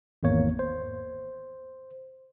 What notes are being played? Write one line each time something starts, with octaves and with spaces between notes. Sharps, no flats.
G#1 E2 A#3 C#5
C5